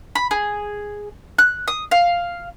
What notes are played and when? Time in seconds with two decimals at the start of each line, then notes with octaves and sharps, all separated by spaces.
0.15 B5
0.31 G#4
1.38 F#6
1.68 D#6
1.91 F5